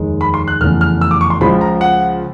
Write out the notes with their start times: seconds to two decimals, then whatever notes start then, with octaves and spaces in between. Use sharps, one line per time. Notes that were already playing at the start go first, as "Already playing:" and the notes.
Already playing: F1 D#2 D#3 G#3
0.21 B5
0.34 C6
0.48 F#6
0.61 F1 E2 C#3 E3 A3 F6
0.81 F6
1.01 E6
1.11 D6
1.21 C#6
1.30 C6
1.41 C#2 C#3 F3 G#3 B5
1.61 A#5
1.81 F#5